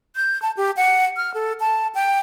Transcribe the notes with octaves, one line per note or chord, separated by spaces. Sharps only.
G6
A5
G4
F#5
F6
A4
A5
G5